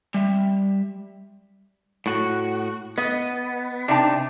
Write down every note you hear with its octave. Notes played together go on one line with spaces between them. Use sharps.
G3 E5
A2 F#4
B3 D#5
C3 D4 D#4 A5